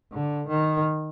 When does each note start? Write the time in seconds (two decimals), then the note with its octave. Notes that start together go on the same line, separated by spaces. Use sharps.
0.12 D3
0.48 D#3